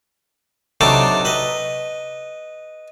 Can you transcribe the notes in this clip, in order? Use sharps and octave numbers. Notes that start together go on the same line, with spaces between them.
C3 F#3 A3 D4 D#4 A4
B4 D#5